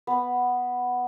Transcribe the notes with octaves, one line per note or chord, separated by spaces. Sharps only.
B3